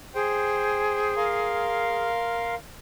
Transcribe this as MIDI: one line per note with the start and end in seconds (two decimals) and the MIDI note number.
0.15 2.08 68
0.15 1.14 72
0.15 1.14 79
1.16 2.55 70
1.16 2.55 77
1.16 2.55 84